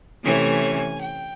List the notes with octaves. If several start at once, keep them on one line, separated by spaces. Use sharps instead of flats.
C3 E3 A3 C#4 G#5
G5